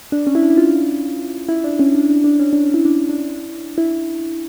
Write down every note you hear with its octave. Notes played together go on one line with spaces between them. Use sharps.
D4
C#4
E4
D4
E4
F4
E4
D4
C#4
D4
D4
D4
C#4
D4
C#4
E4
D4
D4
E4